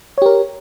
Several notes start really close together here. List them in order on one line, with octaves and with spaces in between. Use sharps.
C#5 G4 A#4